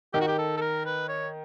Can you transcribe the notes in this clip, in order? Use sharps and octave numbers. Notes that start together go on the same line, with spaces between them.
D#3 G4
F#4
G4
A4
A4
A#4
B4
C#5